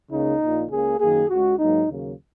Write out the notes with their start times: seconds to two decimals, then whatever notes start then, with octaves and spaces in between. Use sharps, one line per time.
0.11 C#2 C#3 A#3 D#4
0.41 A#1 A#2 A#3
0.70 C#2 C#3 A#3 G#4
0.99 F#2 D#3 A#3 G#4
1.29 C#2 C#3 G#3 F#4
1.59 G#2 F#3 A#3 D#4
1.89 D#2 C#3 F#3 A#3